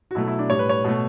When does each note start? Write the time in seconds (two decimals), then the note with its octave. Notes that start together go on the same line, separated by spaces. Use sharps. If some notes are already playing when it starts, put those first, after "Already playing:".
0.11 F#4
0.15 B2 F#3 A3 E4
0.28 E4
0.39 D4
0.50 A2 G3 C#5
0.59 B4
0.69 C#5
0.84 B2 A3